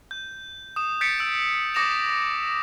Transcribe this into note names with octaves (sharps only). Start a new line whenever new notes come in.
G6
D#6 E7
G6 A6 B6 C#7 D7
E6 D7
D6 D#6 A#6 C#7 E7 F7